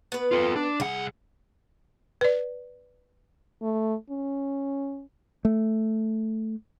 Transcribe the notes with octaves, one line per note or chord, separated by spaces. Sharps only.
B3 B4
F4 A4
D4
C2 G#4 F#5
B4 D5
A3
C#4
A3